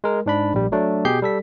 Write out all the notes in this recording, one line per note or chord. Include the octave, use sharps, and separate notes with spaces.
G#3 A#4
G#2 D4 B5
A#1 G3
F#3 A3 D4
B2 G4 G#4 G6 C7
G3 A4 B6